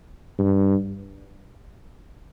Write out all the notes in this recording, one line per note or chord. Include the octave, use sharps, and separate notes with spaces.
G2